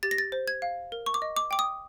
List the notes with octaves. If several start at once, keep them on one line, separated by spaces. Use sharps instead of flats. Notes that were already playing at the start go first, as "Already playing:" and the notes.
G4 A6
A#6
A6
C5
G#6
F5
A#4
C#6
D6
D#5
D6
G5 D6
D#6